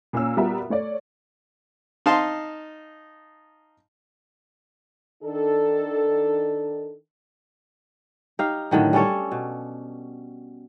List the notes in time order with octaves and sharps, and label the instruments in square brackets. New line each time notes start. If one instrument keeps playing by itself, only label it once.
[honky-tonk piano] A#2 A#3 C#4 E6
G3 B3 F4 F#4 A#4 E5
A3 C#5 D5
[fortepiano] D#4 F5 A5 C6
[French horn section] D#3 D4 A4
[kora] D#4 G4 F5
A2 D3 D#3 F#3
G3 C#4 A4 C#5
B2